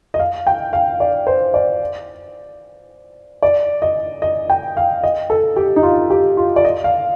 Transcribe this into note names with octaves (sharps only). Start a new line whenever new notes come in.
D#5
F5
G5
F5
D5
C5
D5
D5
D#5
D#5
G5
F5
D#5
A4
G4
D#4
F4
G4
F4
D5
D#5
F5